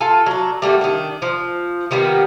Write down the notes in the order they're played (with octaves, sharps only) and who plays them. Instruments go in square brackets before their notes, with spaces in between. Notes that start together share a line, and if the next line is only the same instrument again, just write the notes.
[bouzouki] F4 A4 G#5
F#3 D4
G3 A3 A#3 F#4
D#3 D4
F3
D#3 G3 A#3 B3